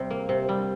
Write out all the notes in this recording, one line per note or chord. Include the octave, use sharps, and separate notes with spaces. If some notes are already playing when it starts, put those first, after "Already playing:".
Already playing: C3 G3
A#3
C3
G3